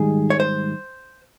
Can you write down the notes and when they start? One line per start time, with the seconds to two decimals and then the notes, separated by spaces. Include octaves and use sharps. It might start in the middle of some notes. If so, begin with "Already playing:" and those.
Already playing: G#2 D#3 G3 G#4
0.30 C#5
0.40 C5